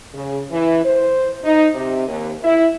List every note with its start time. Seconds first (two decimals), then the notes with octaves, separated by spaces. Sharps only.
0.14 C#3
0.50 E3
0.85 C5
1.44 D#4
1.75 C3
2.07 D#2
2.43 E4